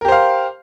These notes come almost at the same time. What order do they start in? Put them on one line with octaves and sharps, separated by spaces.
A#4 G4 C5 F5